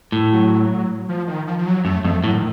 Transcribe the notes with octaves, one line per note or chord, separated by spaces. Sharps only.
A2
F#3
F3
D#3
F3
F3
F#3
F#2 A3
F2 A3
A2 F#3
D#3